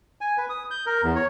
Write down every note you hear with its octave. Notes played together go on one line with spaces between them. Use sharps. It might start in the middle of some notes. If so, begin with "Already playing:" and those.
G#5
B4
D#6
G6
A#4
E2
C#5